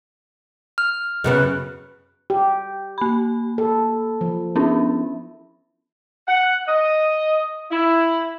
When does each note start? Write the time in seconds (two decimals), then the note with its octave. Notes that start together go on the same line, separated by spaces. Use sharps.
0.78 F6
1.24 F#2 C#3 B3
2.30 G4
2.98 A#3 B5
3.58 A4
4.21 F3
4.56 B3 C#4 D4 E4
6.28 F#5
6.68 D#5
7.71 E4